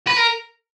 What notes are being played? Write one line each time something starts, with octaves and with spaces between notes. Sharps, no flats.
B4
A#4